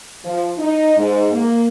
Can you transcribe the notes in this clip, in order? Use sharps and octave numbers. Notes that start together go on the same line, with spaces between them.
F3
D#4
G#2
A#3